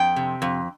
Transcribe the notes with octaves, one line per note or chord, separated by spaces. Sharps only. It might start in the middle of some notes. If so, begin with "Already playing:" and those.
Already playing: F2 G5
C3
F2